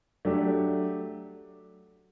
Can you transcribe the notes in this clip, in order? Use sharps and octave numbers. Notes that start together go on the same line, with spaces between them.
F#3 A3 D4 G4